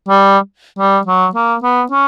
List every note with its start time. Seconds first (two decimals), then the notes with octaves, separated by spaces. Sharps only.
0.09 G3
0.79 G3
1.07 F#3
1.35 A#3
1.63 B3
1.91 C#4